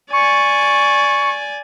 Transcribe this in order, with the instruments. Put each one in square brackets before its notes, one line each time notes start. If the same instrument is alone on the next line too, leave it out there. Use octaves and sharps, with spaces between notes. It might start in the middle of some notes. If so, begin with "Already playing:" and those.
[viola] D5 G#5 [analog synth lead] C#6